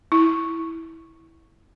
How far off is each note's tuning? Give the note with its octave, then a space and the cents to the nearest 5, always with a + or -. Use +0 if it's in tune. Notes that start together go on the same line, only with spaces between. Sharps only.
E4 -10